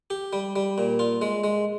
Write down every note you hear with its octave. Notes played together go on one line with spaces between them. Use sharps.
G4
G3
G3
A#2
F4
G#3
G#3